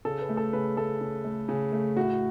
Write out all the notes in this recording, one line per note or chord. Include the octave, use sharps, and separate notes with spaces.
C#3 A4
B4
A3
A4
C#3 B4
A3 A4
C#3
A3
C#3
A3
A2 F#4